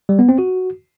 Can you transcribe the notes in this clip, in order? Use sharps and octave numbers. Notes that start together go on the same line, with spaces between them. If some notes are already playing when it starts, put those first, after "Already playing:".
G3
B3
C4
F#4